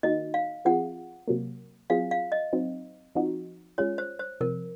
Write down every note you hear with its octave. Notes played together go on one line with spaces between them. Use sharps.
D#3 A#3 D#4 F#4 D#5
F5
F3 C4 F4 G#4 F#5
C3 F#3 A#3
F#3 C4 F4 G#4 F5
F5
D#5
F#3 C4 D#4
F3 C4 D#4 F#4
G#3 C#4 F4 G#4 C#5
C5
C5
C3 F3 C4 A#4